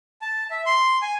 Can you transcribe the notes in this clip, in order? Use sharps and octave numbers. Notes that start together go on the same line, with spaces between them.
A5
E5
C6
G#5